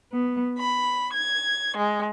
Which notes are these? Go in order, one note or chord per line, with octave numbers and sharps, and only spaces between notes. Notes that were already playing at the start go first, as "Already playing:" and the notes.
B3
B5
G#6
G#3